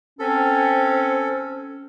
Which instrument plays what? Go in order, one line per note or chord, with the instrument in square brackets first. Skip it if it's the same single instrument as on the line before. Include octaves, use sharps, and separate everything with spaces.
[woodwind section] C4 C#4 [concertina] A4